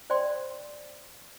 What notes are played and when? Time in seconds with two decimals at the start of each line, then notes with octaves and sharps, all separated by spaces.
0.10 C5 D5 G5 C6